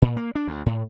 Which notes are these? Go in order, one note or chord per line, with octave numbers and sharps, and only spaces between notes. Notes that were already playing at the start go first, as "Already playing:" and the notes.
A#2
A#3
D4
D2
A2